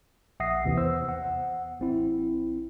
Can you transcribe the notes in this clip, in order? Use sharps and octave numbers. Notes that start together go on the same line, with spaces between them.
A#1 E5 F#5 D#6 A#6 C7
D#2 C3 E3
E2 B3 C5 E6
F#5
A1 C4 E4